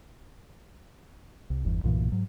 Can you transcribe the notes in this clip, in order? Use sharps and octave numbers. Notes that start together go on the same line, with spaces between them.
C2
G1 E2
B1 G2 A#2 E3
G#2 F#3